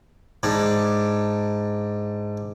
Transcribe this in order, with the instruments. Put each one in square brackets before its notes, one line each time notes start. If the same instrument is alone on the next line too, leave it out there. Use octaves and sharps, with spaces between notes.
[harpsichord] G#2 D4